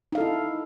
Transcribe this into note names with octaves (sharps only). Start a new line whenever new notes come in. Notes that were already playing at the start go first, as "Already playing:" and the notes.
D#4 E4 A4 F5